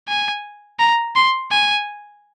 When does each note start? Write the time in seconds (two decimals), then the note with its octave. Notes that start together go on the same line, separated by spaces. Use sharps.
0.08 G#5
0.80 A#5
1.16 C6
1.51 G#5